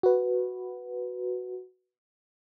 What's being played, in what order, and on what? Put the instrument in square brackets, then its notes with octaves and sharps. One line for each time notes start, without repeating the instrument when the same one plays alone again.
[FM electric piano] F#4 B4